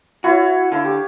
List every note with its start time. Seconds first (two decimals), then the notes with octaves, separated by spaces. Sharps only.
0.24 E4 F#4 C#5
0.72 D3 F5
0.85 G4